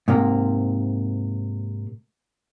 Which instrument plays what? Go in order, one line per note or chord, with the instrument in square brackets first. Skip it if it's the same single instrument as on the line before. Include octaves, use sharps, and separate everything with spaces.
[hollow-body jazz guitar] G#2 C3 A#3